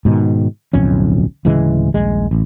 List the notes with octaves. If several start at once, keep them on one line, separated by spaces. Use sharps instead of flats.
G#2 B2 D#3
D1 B1 F2 C#4
D1 C#3 E3 G#3
D#1 A#1 G#3
A1